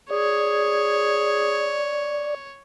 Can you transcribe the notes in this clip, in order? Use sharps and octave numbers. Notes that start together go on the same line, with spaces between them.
G#4 C#5 D5